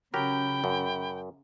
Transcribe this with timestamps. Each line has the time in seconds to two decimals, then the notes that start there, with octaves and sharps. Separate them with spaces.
0.14 C#3 F#3 G4 A#4 G5 B5
0.64 F#2